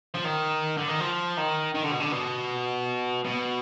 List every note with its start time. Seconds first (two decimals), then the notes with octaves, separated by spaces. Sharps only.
0.14 F3
0.24 D#3
0.78 D3
0.88 D#3
1.00 F3
1.37 D#3
1.74 D#3
1.83 D3
1.91 B2
2.00 D3
2.12 B2
3.25 B2